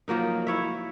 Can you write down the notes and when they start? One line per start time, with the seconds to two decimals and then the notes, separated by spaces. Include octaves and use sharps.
0.08 F3 F#3 A#3 D#4
0.47 E4 C#5 E5